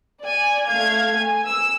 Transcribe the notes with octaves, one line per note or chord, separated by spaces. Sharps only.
D5 G#5
A3 F5 G#6
G#5
E6